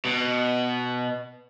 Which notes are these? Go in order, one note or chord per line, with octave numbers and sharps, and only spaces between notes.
B2